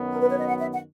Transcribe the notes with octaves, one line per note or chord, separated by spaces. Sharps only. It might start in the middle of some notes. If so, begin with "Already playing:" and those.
Already playing: F#2 D#3 F#3 B3
A#4
B4
C#5
D#5
F#5
E5
F#5